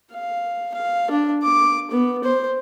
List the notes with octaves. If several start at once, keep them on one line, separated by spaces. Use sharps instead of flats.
F5
F5
D4
D6
B3
C5